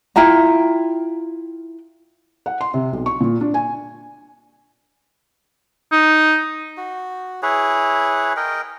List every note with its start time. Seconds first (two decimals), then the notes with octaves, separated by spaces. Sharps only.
0.16 E4 F4 G5 A#5
2.46 F#5
2.61 C6
2.74 C3
2.93 B1
3.06 C#6
3.21 A#2
3.41 D4
3.54 G#5
5.92 D#4
6.77 F#4
7.42 E4 G#4 B4 C#5
8.37 A#4 D#5 G5